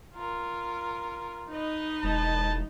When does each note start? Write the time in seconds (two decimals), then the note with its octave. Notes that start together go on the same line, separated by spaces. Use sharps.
0.13 F4 A#4
1.49 D#4 B4 D#5
2.03 E1 A5